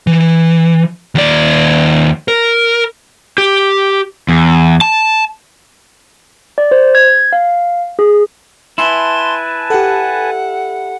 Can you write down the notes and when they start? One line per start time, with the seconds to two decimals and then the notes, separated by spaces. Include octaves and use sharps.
0.07 E3
1.15 D#2 D5
2.28 A#4
3.38 G4
4.29 E2
4.81 A5
6.58 D5
6.71 C5
6.95 G#6
7.33 F5
7.99 G#4
8.78 E4 B4 G#5 A5 C6
9.70 G4 A4 F#5